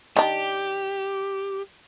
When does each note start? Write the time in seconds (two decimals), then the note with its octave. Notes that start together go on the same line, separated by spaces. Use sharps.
0.17 D#3 D4 G4